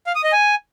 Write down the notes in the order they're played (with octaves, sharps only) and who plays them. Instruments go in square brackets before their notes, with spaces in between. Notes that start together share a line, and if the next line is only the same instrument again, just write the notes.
[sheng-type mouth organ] F5
D#6
D#5
G#5